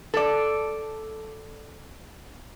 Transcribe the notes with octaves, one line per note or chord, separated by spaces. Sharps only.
A4 D5